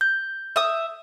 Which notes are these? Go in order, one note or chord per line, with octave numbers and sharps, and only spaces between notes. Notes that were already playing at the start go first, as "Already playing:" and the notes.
G6
E5 D#6